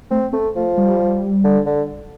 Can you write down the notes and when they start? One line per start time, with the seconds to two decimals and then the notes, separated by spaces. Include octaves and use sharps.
0.11 A3 C4
0.33 A3 C4
0.55 F3 A3
0.77 G3
1.45 D3
1.66 D3